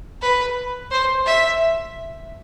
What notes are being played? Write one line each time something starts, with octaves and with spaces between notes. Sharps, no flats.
B4
C5
E5